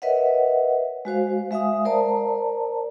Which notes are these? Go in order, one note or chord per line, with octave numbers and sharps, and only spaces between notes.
A#4 B4 C#5 D#5 E5 F#5
G#3 F#4 C5 F5
G#3 E5 F5 G#5 D#6
A#4 C5 D5 A5 A#5